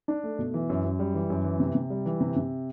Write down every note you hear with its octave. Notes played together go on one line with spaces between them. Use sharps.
D4
A3
B2
E3
F#2
F#2
G3
E3
F#2
E3
C3
C3
G3
E3
C3
C3